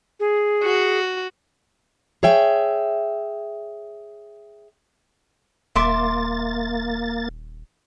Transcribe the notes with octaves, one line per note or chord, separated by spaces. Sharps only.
G#4
F#4
G#4 C#5 E5 G5
D#1 A#3 E5 C6 D6 A6